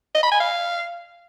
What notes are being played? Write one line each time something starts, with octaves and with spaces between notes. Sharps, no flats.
D#5
B5
G#5
F5